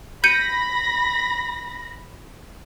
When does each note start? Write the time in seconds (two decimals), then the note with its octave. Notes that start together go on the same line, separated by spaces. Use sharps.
0.24 B5 G6 A#6 C#7 D#7